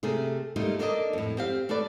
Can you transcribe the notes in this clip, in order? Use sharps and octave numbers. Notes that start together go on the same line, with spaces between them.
C3 A3 G#4 A#4
G3 A3 A#3 D#4 F4 A#4
A#3 D4 A4 A#4 C#5 D#5
F2 A2
C4 G4 F5
A3 A4 B4 D5